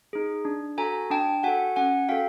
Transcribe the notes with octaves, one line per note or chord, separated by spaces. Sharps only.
D#4 G#4
D4
F#4 A4 G#5 A#5
D4 G5 A5
F#4 A4 F#5 G#5
C#4 F#5 G#5
F#4 A4 F5 G5